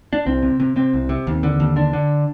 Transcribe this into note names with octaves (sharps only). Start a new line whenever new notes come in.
D4
C2 C4
C3
C3
C3 C4
C2
C3
D#2
D3
D#2
D3 D4
D3